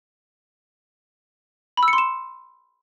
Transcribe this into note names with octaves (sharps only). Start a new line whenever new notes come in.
B5
E6
C#7
C6
E7